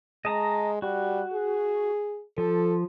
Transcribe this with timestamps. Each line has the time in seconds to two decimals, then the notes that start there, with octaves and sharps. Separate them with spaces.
0.25 G#3 D#5 A5 A#5
0.82 G3 F#4
1.33 G#4
2.38 F3 A4